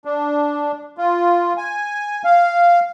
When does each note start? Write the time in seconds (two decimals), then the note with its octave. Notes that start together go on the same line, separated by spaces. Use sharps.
0.05 D4
0.98 F4
1.57 G#5
2.24 F5